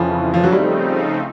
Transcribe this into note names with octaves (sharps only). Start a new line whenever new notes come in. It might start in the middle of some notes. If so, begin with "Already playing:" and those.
Already playing: F2 C#3 E3 F3
F3
F#3
C#3 F3 G3 A3 C4 D#4